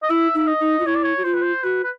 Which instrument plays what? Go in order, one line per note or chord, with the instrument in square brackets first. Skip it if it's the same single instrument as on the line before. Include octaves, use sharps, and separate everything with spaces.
[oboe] D#5
[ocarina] E4 [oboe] E5
[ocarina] D#4 [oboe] E5
[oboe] D#5
[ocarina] D#4
F4
[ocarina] E4 [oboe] C#5
[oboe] D5
C#5
[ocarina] F#4
[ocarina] F4 [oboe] C5
[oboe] B4
C5
[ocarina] F#4 [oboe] B4
[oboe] B4